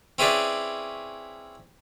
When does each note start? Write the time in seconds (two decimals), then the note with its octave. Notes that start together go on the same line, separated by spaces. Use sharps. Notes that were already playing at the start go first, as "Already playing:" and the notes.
0.18 C4 C#4 E4 G#4 B4 D5